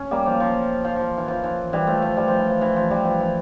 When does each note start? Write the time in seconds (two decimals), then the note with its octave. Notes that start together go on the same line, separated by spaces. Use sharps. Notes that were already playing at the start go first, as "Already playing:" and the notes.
Already playing: C#4
0.11 G3 A#3
0.26 F3
0.40 F3
0.84 F3
0.96 F3
1.18 E3
1.28 F3
1.44 E3
1.73 E3 G3
1.87 F3 A3
2.02 F3
2.17 E3 G3
2.28 F3
2.39 E3
2.50 F3
2.61 E3
2.76 F3
2.90 E3 G3
3.05 F3
3.20 E3